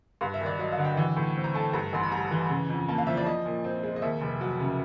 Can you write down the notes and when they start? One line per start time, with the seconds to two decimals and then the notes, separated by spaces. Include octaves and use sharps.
0.21 G2 F5
0.34 E5
0.41 G#1
0.46 D5
0.59 F#3 D#5
0.72 F5
0.78 D3
0.85 G5
0.97 E3
1.16 A2
1.36 C4
1.44 A#5
1.54 A3 A5
1.73 G2 A#5
1.93 A1 C6
2.03 B5
2.12 G3 A#5
2.31 E3
2.49 C#3
2.70 F2
2.88 A#3 A5
2.98 F5
3.07 F3 E5
3.17 D5
3.26 F3 D#5
3.46 A#2
3.64 C4
3.83 G#3
3.96 D#5
4.02 D#2 E5
4.21 F1
4.41 F#3
4.60 C#3